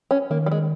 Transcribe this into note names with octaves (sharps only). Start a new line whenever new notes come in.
C#4
D#3 A#3
G3
G#3